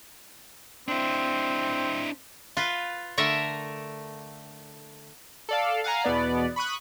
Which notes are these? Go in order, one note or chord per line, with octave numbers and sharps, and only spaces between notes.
C4 D4 E4
F4 B4
D3 A3 A#4 E5
A4 D5 F5
F5 F#5 G#5 A#5
E2 B2 B3 D5
B5 C#6 D#6 F#6